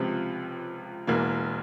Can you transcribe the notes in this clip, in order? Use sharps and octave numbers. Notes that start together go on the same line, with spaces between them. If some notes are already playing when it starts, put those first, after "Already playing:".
Already playing: C#2 C3 F3 C4
E1 E2 E3 A#3